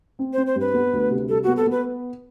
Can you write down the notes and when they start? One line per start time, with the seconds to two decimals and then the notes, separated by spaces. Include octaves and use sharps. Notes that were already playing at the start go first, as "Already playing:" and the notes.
0.19 C4
0.33 C4 C5
0.47 C5
0.56 G2 B4
0.74 B3
0.93 D2
1.10 C3
1.29 G3 A4
1.43 B3 F#4
1.57 A4
1.67 B3 B4